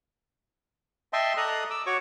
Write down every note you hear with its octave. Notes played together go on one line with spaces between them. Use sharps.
D#5 E5 G5 A5 C6
A4 D5 D#5 A#5 D#6 F#6
D6 E6
F#4 C#5 C#6 D6